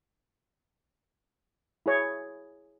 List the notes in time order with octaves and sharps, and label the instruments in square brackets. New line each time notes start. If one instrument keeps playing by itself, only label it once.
[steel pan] E4 G#4 C#5